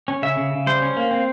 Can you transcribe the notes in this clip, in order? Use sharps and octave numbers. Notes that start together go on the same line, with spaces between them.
C#4
C#3 E5
C#3
C#3
G3 C5
C#4
A#3
C4